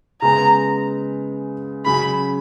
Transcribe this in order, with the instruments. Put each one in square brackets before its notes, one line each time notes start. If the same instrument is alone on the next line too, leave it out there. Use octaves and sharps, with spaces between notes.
[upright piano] C#3 G#3 B3 [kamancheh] A#5
[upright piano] C#3 F#3 C#4 [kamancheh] B5